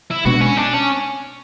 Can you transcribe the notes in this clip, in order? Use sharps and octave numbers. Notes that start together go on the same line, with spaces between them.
E4
B2 G#3 B3 D4 F#4
C#4
D4
C#4